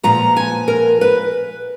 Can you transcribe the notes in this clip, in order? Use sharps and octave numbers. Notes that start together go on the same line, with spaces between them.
A#2 F3 B3 A#5
G#5
A#4
B4